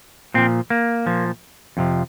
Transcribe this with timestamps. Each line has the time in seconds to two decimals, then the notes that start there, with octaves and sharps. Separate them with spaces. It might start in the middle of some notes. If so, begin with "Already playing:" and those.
0.34 A#2 F3 C4
0.70 A#3
1.06 A#2 F3
1.77 F2 C3 F3